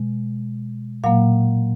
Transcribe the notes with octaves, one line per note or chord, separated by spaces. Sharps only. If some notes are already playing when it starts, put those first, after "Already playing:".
Already playing: B2 G#3
A#2 F#3 A#3 F5